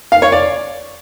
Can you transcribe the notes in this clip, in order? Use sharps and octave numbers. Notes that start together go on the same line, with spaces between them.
F5
C#5
D5